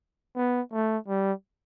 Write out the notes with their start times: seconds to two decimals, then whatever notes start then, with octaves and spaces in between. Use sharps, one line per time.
0.36 B3
0.73 A3
1.08 G3